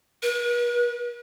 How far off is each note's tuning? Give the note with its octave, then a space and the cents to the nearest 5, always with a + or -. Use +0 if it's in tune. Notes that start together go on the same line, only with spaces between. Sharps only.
B4 -45